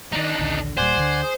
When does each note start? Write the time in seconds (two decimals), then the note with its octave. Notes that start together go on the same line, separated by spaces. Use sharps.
0.12 D#3 F#3 D4 D#4
0.39 A#1 D#2 D3
0.77 D#1 A#2 G3 C5 D5 F#5 G#5
0.97 D2 D3
1.23 G#4